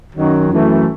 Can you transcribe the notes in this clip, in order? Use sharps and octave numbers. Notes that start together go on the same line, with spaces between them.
F#2 D#3 F#3
F#2 E3 A3